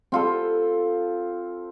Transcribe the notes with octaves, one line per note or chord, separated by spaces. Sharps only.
C4 F4 A4